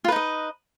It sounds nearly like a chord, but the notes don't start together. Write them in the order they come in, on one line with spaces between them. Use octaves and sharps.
F4 B4 D#4 D#5